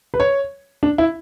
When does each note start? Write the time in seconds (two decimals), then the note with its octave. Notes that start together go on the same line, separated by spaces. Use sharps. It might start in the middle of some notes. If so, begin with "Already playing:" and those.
0.14 B4
0.20 C#5
0.83 D4
0.98 E4